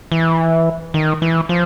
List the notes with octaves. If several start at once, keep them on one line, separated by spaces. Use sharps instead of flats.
E3
D#3
E3
F3